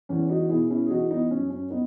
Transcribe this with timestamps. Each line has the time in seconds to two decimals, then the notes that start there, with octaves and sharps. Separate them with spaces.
0.09 E2 C#4
0.29 D#4 F#4
0.49 B2 E4 G#4
0.70 C#4 E4
0.86 G#4
0.90 E3 D#4 F#4
1.10 B3 D#4
1.31 F#2 C#4
1.50 C#4
1.70 B3 D#4